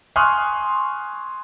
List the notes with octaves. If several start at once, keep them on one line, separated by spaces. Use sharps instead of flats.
G#5 C6 C#6 D#6 F6 F#6